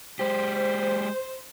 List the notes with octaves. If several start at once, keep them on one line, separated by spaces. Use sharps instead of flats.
G#3 G4 C5